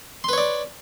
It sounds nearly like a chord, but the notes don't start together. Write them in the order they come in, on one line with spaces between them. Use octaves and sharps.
C6 B4 C#5 D5